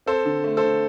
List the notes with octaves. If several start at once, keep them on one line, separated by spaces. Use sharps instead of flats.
C4 A4 C5
D3
A3
A4 C5
D3